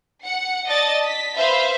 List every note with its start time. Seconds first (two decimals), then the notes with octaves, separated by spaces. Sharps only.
0.24 F#5 C#7
0.68 D5 D#5 A5 A6 A#6
1.04 B6
1.36 B4 C5 E5 F5 B5